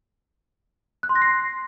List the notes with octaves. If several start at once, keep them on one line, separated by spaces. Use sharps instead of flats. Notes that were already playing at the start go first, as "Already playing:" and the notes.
F#6
C6
A#6
C7